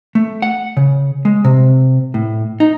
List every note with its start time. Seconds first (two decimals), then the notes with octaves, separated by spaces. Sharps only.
0.15 A3
0.42 F#5
0.77 C#3
1.25 G#3
1.45 C3
2.14 A2
2.60 D#4